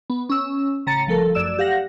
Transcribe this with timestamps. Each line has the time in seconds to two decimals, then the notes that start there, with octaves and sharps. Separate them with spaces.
0.10 B3
0.29 C#4 E6
0.86 A1 C#3 A#5 A6 C#7
1.07 G1 F3 A3 A4 A#4
1.35 F#2 D5 E6 E7
1.59 G4 F5 F#5 A#6